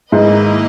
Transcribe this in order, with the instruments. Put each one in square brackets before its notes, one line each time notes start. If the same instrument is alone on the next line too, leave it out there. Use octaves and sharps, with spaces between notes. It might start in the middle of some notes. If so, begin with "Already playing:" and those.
[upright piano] G#2 [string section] D#3 A#3 E4 B4 D#5